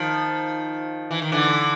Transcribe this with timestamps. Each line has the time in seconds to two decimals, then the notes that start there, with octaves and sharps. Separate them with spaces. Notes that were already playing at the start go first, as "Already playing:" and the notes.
Already playing: D#3 F3
1.11 E3
1.22 D#3
1.32 D3 E3